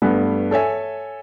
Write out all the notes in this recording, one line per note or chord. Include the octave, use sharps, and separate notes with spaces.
G2 A3 B3
A4 C#5 E5 G#5